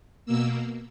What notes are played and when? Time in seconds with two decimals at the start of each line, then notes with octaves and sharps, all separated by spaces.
0.26 B2 A#3 E6